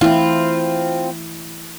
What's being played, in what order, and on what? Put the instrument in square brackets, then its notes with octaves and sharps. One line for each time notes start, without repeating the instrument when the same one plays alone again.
[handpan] E3 A3 E4 [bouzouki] C4 F4